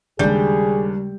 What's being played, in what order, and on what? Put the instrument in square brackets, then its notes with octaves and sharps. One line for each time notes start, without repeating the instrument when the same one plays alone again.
[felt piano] D#2 D4 G6 [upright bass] C#3 G#3 [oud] G3 [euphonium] G#4